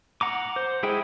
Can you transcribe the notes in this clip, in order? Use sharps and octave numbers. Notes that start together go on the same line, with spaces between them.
F#5 A#5 D6
C5
G#3 E4 G#4 G5